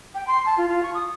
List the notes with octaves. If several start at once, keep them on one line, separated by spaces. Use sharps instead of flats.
G5
C6
A5
F4
F4
C#6
D#6